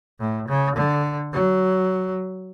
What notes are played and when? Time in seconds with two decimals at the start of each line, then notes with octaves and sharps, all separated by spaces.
0.19 A2
0.48 C#3
0.75 D3
1.32 F#3